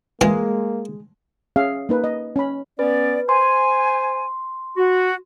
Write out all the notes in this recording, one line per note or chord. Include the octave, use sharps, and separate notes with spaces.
E3 G#3 A#3 F4
C#4 G#4 E5 F5
A#3 D#4 B4
D#5
C#4 B5
B3 C#4 B4 D5
C5 G#5 C6
F#4